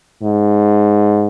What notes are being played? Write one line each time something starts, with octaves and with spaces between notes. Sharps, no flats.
G#2